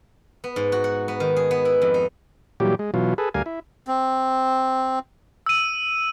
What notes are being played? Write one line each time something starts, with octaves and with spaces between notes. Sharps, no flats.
B3
G#2
F#4
F#5
B3
D#3
G#4
B3
E4
F2
D#4
A#2 E3 F#3 G3 G4
G#3
B2 E3 F#3 F4
G#4 A4 B4
D2 G3 A#4 F5 G#5
E4
C4
E6 D#7